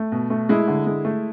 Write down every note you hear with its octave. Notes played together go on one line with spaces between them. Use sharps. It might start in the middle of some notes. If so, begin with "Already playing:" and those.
Already playing: A3
B2
A3
G#3 E4
D3
G#3
A3